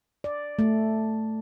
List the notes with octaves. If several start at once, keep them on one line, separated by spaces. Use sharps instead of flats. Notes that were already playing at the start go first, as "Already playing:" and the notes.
D5
A3